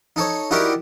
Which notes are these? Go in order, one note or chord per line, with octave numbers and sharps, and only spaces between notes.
D#4 A4 C#5
D#4 E4 F#4 G4 A#4 D5